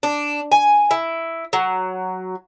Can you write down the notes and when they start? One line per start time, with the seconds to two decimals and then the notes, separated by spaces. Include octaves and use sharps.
0.03 D4
0.52 G#5
0.91 E4
1.53 F#3